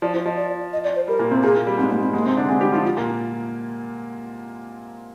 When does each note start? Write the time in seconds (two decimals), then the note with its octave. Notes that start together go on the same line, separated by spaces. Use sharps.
0.02 F3 D5
0.14 F3 C5
0.25 F3 D#5
0.36 D5
0.73 D#5
0.84 D5
0.96 C5
1.08 G3 A#4
1.19 A#2 A#3
1.31 C3 C4
1.43 A#2 A#3 G#4
1.55 A#2 A#3
1.67 G3
1.78 G#2 G#3 C4
1.90 G3 A#3
2.02 G3 C4
2.13 G#2 G#3 A#3
2.25 C3 C4
2.37 D3 D4
2.49 G#3 C4 G#4
2.61 G3 D4 G4
2.72 F3 D#4 F4
2.85 F4
2.97 A#2 A#3